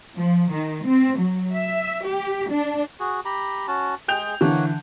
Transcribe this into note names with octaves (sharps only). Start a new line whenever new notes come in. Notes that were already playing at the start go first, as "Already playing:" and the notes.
F3
D#3
C4
F#3
E5
G4
D4
F#4 G#4
G4 A#5 B5
C#4 F#4 A5
G#3 G#4 G5 G6 F7
D3 E3 A#3 C#5 F#5